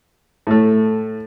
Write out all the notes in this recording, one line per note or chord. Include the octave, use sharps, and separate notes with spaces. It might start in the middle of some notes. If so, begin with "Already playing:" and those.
A2 A3